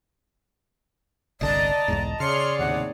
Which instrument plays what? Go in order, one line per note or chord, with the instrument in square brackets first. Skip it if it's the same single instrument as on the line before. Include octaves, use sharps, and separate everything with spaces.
[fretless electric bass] G1 C2 D3 [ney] D5 [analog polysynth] D#5 A5 A#5
[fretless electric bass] B1 E2 G#2
[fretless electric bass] C#3 [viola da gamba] G#4 C#5 D5 [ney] C6 [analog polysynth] F6 C7 C#7
[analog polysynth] D#2 A2 C3 [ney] F#5